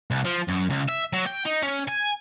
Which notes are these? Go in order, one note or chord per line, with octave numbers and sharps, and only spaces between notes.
C2
F3
F#2
C#2
E5
F#3
G5
D#4
C#4
G#5